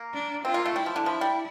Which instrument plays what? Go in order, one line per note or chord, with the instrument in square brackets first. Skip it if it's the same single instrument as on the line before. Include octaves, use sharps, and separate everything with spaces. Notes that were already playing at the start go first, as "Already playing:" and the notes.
Already playing: [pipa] A#3
[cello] D4
[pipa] C4 [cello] F4
[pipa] A#3
A3
[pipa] G3 [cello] E4
[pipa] F3
D3
[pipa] F3 [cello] E4
[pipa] G3